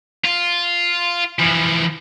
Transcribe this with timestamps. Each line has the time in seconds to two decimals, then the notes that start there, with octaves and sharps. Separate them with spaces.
0.25 F4
1.39 E3 F3